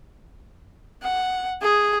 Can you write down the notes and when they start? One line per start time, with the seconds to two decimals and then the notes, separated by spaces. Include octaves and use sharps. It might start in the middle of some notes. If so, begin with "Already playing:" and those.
1.02 F#5
1.62 G#4